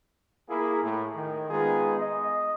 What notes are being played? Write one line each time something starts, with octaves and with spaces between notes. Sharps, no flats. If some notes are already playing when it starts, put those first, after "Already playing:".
A#3 E4 G#4
A2
D#3
D#3 G#3 B3 D#4 F4 G#4
D#5